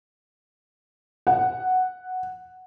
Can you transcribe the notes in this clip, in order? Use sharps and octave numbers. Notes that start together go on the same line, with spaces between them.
F#5